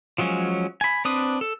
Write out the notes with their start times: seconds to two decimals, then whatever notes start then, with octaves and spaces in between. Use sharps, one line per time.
0.18 F3 F#3 G#3 C#4
0.81 G#5 B5
1.05 C4 D4 B4 D#6
1.41 A4